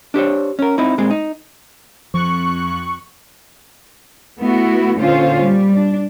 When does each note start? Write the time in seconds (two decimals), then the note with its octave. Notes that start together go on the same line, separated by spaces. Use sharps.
0.14 D4 G4 C5 C#5
0.59 C#4 A#4
0.78 C4 D#4 E4
0.98 A#2 G#3 C4
1.10 D#4
2.14 F2 F3 C#6 F#6
4.39 A3 B3 E4 F#4
4.97 A#2 D3 C#4 F4 C5 F5
5.41 G3
5.75 D4